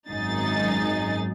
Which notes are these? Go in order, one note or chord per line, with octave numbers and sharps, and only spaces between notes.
G#1 F#2 D#4 G#4 A6